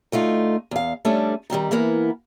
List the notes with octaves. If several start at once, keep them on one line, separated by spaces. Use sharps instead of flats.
D2 A3 D#4 F4
E2 F5
G3 A3 C#4 D4 A4
D#3 G3 C4 D#4
E3 A#3 B3 E4 A#4